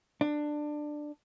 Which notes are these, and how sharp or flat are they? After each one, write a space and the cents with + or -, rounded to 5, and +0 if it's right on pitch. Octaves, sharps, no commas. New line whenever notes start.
D4 +15